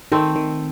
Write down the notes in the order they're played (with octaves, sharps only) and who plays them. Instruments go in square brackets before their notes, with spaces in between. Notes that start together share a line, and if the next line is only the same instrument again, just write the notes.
[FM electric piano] D#3 [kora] A3 C4
[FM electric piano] D#3